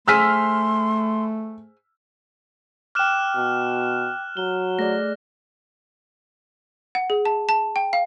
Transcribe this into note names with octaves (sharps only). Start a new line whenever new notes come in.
A3 G#4 C5 G#5 C6 E6 F6 B6
G5 D6 F6 F#6 E7
B2
F#3 G7
A3 G#4 D5 A#6
F#5
G#4
A5
A5
G5
F5